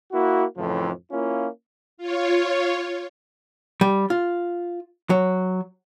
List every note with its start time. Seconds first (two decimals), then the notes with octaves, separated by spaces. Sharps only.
0.12 A#3 E4 F#4
0.57 F2 A2 C#3 E3 F3
1.11 A#3 C#4 E4 F4
1.98 F4 C#5
3.81 G3
4.10 F4
5.10 F#3